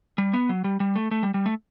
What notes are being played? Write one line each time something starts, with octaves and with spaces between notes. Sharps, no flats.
G3
B3
F#3
G3
G3
A3
A3
G3
G3
A3